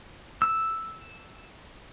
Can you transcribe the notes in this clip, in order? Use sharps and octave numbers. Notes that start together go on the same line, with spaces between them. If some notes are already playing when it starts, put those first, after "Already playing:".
E6